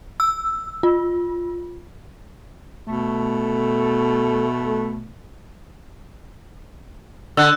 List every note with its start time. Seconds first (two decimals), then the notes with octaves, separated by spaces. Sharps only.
0.20 E6
0.83 F4
2.87 B2 A3
7.37 D3 E6 F#6